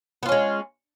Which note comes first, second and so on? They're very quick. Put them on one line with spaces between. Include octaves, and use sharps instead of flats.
B3 F4 C#4 G#3